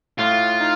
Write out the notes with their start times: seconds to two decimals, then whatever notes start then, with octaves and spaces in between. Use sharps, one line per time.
0.19 A2 F4
0.61 D#4